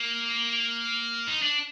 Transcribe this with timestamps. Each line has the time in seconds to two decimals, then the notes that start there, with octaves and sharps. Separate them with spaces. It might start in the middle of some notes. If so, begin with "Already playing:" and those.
Already playing: A#3
1.27 D#4
1.42 D4